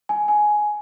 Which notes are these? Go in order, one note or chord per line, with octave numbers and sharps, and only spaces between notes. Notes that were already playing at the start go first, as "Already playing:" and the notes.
G#5
G#5